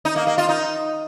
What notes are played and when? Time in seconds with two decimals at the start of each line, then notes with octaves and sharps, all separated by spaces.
0.05 D#4
0.16 A#3
0.27 A#3
0.38 F4
0.49 D#4